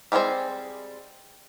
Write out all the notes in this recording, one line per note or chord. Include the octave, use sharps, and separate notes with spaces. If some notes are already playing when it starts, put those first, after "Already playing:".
G3 G#3 C4 G#4 C5